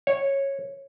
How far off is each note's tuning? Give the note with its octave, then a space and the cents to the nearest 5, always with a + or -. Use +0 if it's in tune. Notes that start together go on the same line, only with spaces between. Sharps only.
C#5 -10